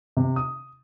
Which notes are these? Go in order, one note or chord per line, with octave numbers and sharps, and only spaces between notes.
C3
D#6